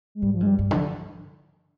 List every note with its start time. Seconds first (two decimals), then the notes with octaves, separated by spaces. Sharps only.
0.15 G#3
0.22 G#2 G3
0.34 F3
0.40 G2 G#3
0.47 G3
0.59 G2
0.71 D3 F3